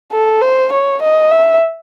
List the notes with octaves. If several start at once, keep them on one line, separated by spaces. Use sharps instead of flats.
A4
C5
C#5
D#5
E5